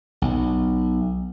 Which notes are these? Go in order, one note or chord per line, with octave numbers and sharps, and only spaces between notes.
B1